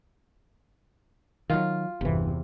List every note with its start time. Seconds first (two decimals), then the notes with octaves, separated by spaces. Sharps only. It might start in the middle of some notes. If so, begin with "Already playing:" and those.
1.50 D#3 F#3 F4
2.01 G1 E2 C3 E3